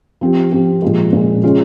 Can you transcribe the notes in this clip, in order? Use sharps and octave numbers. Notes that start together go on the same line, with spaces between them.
F3 C4 G4
F3 C4 G4
A#2 F3 G#3
A#2 F3 G#3
C#3 G#3 C#4 F4 G#4